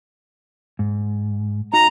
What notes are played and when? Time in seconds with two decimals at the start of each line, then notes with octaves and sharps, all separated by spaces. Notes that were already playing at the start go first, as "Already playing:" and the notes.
0.79 G#2
1.73 D#4 F#4 A#5